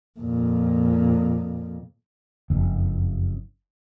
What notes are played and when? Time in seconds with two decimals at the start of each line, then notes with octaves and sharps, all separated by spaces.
0.19 F2 A#2
2.50 F#1 F2